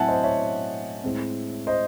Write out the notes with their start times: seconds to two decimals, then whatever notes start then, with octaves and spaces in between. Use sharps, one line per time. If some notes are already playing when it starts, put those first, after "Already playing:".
Already playing: A2 F#3 C4 E5 F#5 G#5 A5
0.08 C5 D#5
0.24 C#5 E5
1.04 A2 G#3 C4
1.67 C5 D#5